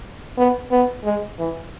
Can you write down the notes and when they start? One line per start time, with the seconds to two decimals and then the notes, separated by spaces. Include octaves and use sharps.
0.37 B3
0.71 B3
1.04 G#3
1.39 E3